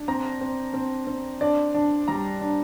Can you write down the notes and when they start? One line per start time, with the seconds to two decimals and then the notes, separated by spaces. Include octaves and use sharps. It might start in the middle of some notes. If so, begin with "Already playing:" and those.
Already playing: D4
0.08 C4 A#5
0.41 C4
0.74 C4
1.07 C4
1.41 D4 D5
1.74 D4
2.08 G3 A#5
2.41 D4